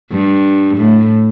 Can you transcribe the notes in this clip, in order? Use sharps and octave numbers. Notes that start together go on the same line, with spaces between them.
G2
A2